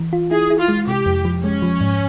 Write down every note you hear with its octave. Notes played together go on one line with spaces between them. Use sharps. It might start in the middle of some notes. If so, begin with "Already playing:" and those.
Already playing: E3
F4
E4 G#4
E4
F4
G#3
C3 G4
F2
F3
G#3 C#4
F3
G#2